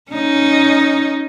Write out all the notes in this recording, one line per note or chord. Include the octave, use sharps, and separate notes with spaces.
C#4 D#4